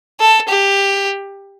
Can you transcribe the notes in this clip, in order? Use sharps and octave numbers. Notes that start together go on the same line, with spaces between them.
A4
G4